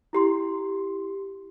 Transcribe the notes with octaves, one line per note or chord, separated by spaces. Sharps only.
E4 G4 C6